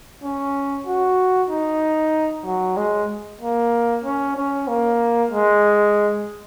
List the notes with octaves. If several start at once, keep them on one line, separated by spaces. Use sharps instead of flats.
C#4
F#4
D#4
F#3
G#3
A#3
C#4
C#4
A#3
G#3